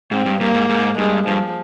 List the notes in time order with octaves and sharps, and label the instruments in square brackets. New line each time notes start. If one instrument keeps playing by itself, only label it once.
[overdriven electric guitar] G#2 [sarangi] C4
[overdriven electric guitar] G2
[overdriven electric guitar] G2 [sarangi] A#3
[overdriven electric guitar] G#2
G#2
[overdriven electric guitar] G2 [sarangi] G#3
[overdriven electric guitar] G2 [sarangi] F3